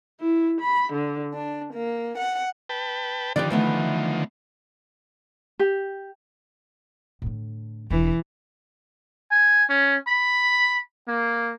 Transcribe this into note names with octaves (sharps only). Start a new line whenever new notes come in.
E4
B5
D3
D4
A#3
F#5
B4 G5 A5
D3 D#3 F3 G4 B4 D5
E3 A3 B3
G4
A2 D3
E1 E3 D4
G#5
C#4
B5
A#3